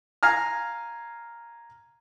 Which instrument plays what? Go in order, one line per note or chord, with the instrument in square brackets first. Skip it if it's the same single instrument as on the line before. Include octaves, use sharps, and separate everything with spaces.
[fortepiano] F5 G#5 A#5 F6